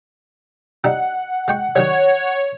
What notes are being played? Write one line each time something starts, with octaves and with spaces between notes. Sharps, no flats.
G3 D#4 E4 F#5
G#3 G5 C#6
D#3 F#3 G3 C#5